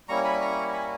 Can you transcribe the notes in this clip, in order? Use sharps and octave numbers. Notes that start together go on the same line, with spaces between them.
G3 A#3 C#4 E4 A#5 C#6
G#5 B5
A#5 C#6
G#5 B5